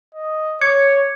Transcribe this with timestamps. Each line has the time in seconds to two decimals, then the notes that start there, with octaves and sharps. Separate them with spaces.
0.15 D#5
0.61 C#5 D6 G#6 C#7